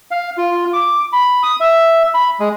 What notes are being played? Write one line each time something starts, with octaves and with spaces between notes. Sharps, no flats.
F5
F4
D6
B5
D#6
E5
B5
G#3